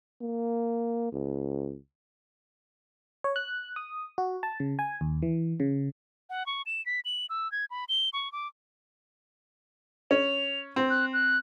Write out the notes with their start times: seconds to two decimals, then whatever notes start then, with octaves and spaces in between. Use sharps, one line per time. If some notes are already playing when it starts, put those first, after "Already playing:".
0.21 A#3
1.13 C#2
3.24 C#5
3.36 F#6
3.76 D#6
4.18 F#4
4.43 A5
4.60 C#3
4.79 G#5
5.01 D#2
5.22 E3
5.60 C#3
6.30 F#5
6.46 C#6
6.66 E7
6.86 B6
7.05 F#7
7.30 E6
7.52 G#6
7.71 B5
7.89 G7
8.13 C#6
8.32 D6
10.11 C#4 F7
10.76 C4
10.90 F#6
11.13 F#6